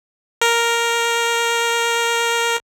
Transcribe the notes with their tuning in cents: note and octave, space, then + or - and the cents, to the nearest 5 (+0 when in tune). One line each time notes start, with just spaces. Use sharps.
A#4 +0